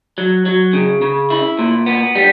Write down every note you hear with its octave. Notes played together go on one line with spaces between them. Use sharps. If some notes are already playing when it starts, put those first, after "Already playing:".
F#3
F#3
C#3
C#3
E4
A#2
B3
G3